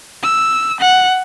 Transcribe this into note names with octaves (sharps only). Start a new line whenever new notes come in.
E6
F#5